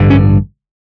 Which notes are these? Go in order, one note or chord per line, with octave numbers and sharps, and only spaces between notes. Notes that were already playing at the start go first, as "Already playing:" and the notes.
Already playing: A1 G2 D3
C#4